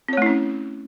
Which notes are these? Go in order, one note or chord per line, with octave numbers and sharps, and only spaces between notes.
A3 C4 C#4 E4 C#5